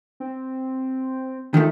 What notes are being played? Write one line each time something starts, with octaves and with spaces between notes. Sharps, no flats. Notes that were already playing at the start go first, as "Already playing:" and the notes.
C4
D#3 F3 A3